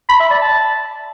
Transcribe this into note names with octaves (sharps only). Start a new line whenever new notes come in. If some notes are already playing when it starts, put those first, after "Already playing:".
B5
E5
D5
A5